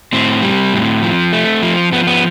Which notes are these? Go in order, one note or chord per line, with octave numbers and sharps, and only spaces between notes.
A2 C4
G3
A2
F3
A3
F3
F3 B3
B3